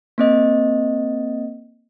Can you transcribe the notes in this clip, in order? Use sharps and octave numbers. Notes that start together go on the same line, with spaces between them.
A#3 C4 D#5